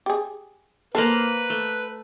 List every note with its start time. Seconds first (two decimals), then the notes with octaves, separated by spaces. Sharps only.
0.06 G4 G#4
0.95 A#3 A4 B4 C5 F5
1.50 A3